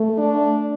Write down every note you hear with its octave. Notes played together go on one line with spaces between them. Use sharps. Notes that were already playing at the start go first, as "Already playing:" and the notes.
Already playing: A3
D4